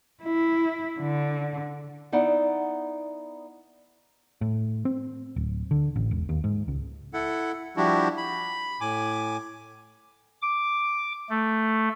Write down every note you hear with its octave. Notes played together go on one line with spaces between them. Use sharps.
E4
D3
B3 D#4 E4 D5 F#5
A2
C4
D1
D3
A1
E1
D#2
G#2
C#2
E4 A4 F#5
F3 G3 D4 E4 F#4 G4
B5
A2 G#5 D6
D6
A3